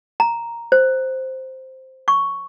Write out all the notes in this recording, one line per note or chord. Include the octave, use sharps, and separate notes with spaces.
A#5
C5
C#6